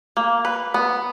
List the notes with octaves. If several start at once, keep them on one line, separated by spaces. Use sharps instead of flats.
A#3
B4
B3